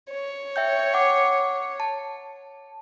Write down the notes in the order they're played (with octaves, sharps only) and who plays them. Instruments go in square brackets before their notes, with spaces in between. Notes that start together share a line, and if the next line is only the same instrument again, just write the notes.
[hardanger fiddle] C#5
[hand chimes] E5 G5 G6
F#5 D6
A5